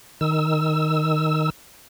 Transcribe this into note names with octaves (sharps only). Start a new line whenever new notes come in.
D#3 E6